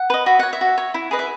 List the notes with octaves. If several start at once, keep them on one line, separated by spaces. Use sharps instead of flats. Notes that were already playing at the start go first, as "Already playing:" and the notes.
Already playing: F#5
B4 D#5
F#4 E5
C#5 F#5
E5
F#4
C#5
E4
G#4 B4 D#5
E5